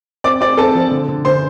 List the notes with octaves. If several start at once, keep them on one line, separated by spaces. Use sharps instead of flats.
C4 D5 D6
C4 D5 D6
C4 A4 A5
F3
D3
D3
D3 C5 C6